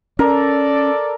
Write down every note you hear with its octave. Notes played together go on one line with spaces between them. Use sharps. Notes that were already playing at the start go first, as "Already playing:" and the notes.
C#4 A4 A#4 D5